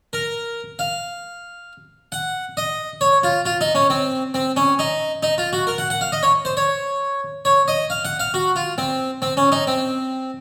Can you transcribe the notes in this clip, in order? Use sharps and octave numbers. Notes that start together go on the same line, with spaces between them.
A#4
F5
F#5
D#5
C#5
F4
F4
D#4
C#4
C4
C4
C#4
D#4
D#4
F4
F#4
A#4
F#5
F#5
F5
D#5
C#5
C5
C#5
C#5
D#5
F5
F#5
F5
F#4
F4
C4
C4
C#4
D#4
C4